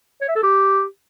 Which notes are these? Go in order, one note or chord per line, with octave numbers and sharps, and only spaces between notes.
C#5
E5
A4
G4